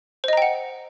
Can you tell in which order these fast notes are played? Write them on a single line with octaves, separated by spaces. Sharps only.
C5 D#5 A#5 G5 F#5